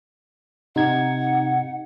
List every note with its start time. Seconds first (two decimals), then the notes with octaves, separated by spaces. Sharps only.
0.76 C3 D#4 F#5 G#6